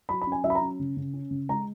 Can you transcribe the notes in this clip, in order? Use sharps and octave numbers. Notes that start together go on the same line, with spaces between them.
F#3 B5
B5
C#4
G#5
F#3 E5
B5
A#5
C#4
C#3
C#3
C#4
C#3
G#3 A#5